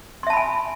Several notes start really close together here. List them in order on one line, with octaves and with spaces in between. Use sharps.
C6 E5 A5 B5 G#5